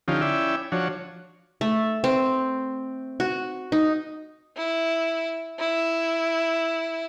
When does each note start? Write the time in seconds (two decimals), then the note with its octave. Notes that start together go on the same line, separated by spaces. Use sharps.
0.08 D3 F3 C#4 D#4 F4 G4
0.21 C#4 E4 D5 E5 G5
0.72 F3 D4 F#4 C#5
1.61 A3
2.04 C4
3.20 F#4
3.72 D#4
4.57 E4
5.59 E4